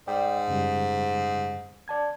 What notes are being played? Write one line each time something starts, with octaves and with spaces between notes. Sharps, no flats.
G#2 D5 G5
F#2 C#3 G3
D5 A5 G#6